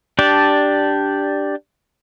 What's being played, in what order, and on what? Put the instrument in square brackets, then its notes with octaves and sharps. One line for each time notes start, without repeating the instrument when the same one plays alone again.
[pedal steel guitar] D4 G4 D5 A5